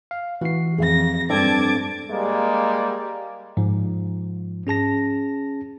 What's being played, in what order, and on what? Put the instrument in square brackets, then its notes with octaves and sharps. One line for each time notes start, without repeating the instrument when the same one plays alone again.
[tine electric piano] F5
[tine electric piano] E3 C7 [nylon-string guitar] F#4
[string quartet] F2 A#6 [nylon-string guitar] G#4 F5
[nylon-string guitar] G2 D5 [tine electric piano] C4 D4 A4 [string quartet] A5 D6 G#6
[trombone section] G3 G#3 A#3
[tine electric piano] G#2 F3
C#4 G#4 A5 A#6